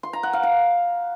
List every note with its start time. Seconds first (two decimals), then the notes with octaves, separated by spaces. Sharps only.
0.03 C6
0.13 A#5
0.23 F#5
0.33 F5
0.43 A#5